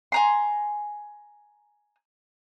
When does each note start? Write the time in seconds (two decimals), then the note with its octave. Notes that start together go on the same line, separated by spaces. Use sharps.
0.12 G#5 A#5 C6